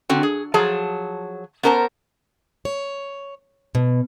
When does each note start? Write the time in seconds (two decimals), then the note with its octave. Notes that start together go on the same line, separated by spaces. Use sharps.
0.09 D3 C4 F#4
0.23 G#4
0.54 F3 F#3 G#4 A5
1.63 B3 C#4 A#4 C5 A5
2.65 C#5
3.75 B2